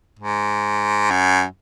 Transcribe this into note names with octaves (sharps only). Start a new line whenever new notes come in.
G#2
F#2